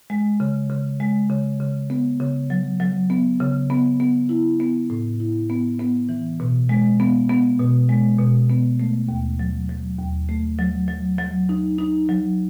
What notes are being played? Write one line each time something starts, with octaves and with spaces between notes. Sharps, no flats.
G#3
C#3
C#3
G#3
C#3
C#3
B3
C#3
F#3
F#3
B3
C#3
B3
B3
E4
B3
A2
E4
B3
B3
E3
B2
G#3
B3
B3
B2
G#3
B2
B3
A3
D#2
F#3
F#3
D#2
A3
F#3
F#3
F#3
D#4
D#4
F#3